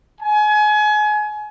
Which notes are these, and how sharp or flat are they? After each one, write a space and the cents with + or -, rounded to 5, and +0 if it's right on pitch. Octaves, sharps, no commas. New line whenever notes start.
G#5 +30